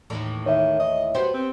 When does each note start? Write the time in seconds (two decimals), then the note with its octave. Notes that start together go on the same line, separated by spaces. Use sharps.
0.10 D#2 A2 E3
0.46 D#3 C#5 E5
0.80 D#5
1.14 F#3 B3 G4 C5
1.34 C4